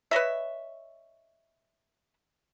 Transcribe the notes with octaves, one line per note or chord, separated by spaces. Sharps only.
B4 C#5 D#5 E5